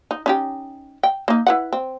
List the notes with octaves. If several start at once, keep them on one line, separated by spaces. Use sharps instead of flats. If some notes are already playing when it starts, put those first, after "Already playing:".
D#4
C#4 D#4 G4
G5
A#3 D#4
E4 B4 F#5
C4